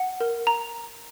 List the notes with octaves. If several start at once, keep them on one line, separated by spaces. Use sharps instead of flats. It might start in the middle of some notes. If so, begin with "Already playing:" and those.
Already playing: F#5
A#4
A#5